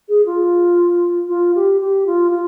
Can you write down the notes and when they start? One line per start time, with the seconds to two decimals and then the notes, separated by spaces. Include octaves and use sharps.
0.09 G#4
0.26 F4
1.29 F4
1.55 G4
1.81 G4
2.06 F4
2.31 F4